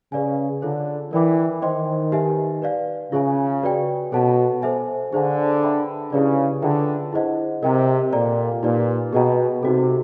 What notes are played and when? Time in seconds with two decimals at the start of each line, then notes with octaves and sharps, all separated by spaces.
0.12 C#3 G#4 B4 D5 F5 G#5
0.62 D3 F4 A4 C#5
1.12 E3 A#4 D5 G5 B5 D6
1.62 D#3 C5 D#5 G5 C6
2.12 D#4 G4 B4 E5 G#5
2.62 B4 D5 F5
3.12 C#3 F4 G#4 C#5 E5 G#5
3.62 F#4 B4 D5 G5
4.12 B2 A4 C#5 F#5 A5
4.62 A4 C5 E5 G#5
5.13 D3 G#4 C5 F5 G#5
5.63 B4 E5 G5 B5
6.12 C#3 E4 G4 B4 D5
6.62 D3 F4 G#4 B4 E5 G5
7.12 E4 G#4 C5 D#5 F#5
7.62 C3 A#4 D#5 G5 A#5
8.13 A#2 A4 D5 G5 A#5
8.63 A#2 D#4 G4 B4 D5
9.13 B2 G#4 B4 D#5 G5 A#5
9.63 C3 D#4 F#4 A4